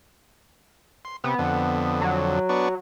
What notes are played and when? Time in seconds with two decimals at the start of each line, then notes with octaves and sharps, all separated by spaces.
1.05 C6
1.24 C3 B3
1.39 F2 D3
2.01 F#3
2.49 B3 D4 C#6